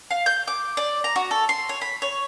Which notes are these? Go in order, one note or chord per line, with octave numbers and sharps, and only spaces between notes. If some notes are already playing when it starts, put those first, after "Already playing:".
F5
G6
D6
D5
A#5
F#4
A4
C6
C#5
B5
C#5